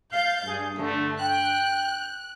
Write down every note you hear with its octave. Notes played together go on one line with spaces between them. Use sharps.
F5 G6 A6
G2 G#4
G2 D3 A3
G5 F#6